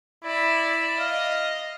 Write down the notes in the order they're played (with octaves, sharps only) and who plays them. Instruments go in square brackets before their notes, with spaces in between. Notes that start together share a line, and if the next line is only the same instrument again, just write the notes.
[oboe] E4 [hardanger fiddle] D5 E5
[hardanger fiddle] D#5 [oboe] F5